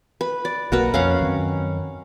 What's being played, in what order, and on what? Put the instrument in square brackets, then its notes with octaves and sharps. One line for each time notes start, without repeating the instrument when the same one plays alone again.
[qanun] B4
D5
[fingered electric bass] B1 A#3 [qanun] F#4 A#4 B4
[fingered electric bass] F2 [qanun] C#4 F5 F#5
[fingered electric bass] F#2 D#3 C4